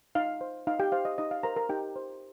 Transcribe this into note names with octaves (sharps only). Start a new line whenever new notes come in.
D#4 F5
C5
D#4 F5
G4 G5
C5 F5
D#5
D#4 D#5
F5
A#4 C5 A#5
A#4 A#5
D#4 G4 G5
C5